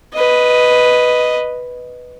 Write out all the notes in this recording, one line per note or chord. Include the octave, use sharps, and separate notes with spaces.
B4 D#5